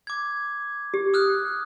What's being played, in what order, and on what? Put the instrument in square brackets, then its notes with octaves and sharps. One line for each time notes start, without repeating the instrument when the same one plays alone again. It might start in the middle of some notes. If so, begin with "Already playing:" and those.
[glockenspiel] D6 G#6
[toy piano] G4
[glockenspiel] D#6 F6 F#6